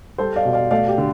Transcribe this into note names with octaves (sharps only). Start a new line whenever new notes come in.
G3 A4 C5
D5 F5
B2
D5 F5
A3 D5 F5
G4
D3